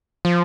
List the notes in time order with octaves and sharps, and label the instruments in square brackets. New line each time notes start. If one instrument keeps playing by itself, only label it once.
[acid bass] F3